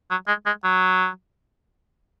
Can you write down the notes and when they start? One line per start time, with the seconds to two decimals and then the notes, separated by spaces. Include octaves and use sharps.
0.11 F#3
0.28 G#3
0.46 G#3
0.64 F#3